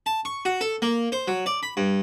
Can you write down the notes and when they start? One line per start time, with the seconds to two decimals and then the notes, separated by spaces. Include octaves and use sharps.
0.06 A5
0.25 C#6
0.45 F#4
0.61 A4
0.82 A#3
1.12 C5
1.28 F#3
1.46 D5
1.63 B5
1.77 G2